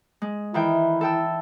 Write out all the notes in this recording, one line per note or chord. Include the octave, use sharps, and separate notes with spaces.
G#3
D#3 E3 E4 G5
A4 G5 E6